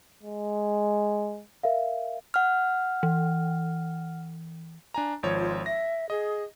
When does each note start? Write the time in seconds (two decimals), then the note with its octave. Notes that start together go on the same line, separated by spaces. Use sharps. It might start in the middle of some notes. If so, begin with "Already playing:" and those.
0.23 G#3
1.63 A#4 E5 F5
2.34 F#5 F6
3.03 E3
4.94 D4 G#5 A#5
5.23 G#1 F3 C#5
5.39 F4
5.66 E5 A#6
6.10 G#4 D#5